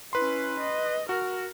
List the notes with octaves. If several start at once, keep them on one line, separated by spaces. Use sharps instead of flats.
C#4 E4 B4 C6
D#5
F#4 A#4